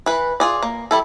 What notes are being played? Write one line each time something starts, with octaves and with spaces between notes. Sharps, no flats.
E3 B4
F4 G#4 D5
A#3
G3 E4 A4